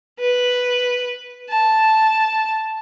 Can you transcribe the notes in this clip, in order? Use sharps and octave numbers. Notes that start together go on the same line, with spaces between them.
B4
A5